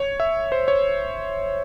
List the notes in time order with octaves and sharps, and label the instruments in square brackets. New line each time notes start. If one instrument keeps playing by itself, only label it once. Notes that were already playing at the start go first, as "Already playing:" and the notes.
Already playing: [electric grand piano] C#5
E5
C5
C#5